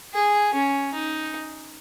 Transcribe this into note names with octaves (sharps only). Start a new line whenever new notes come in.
G#4
C#4
D#4